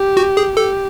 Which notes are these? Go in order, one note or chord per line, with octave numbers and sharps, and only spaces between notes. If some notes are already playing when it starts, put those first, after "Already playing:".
Already playing: G4
F#4
G#4
G4 A4